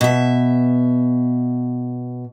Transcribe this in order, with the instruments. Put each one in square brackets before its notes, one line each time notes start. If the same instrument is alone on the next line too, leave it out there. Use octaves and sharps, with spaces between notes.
[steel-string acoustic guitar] B2 E5